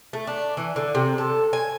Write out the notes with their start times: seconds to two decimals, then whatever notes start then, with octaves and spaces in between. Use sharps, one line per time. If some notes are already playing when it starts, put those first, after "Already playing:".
0.13 A3
0.27 D4
0.57 E3
0.76 D3
0.95 C3
1.18 A4
1.53 G#5